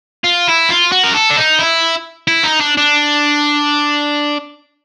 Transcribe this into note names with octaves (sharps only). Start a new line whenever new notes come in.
F4
E4
F4
F#4
A#4
A4
D4
D#4
E4
E4
D#4
D4
D4